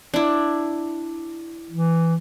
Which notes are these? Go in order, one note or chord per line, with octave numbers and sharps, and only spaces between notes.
D4 E4
E3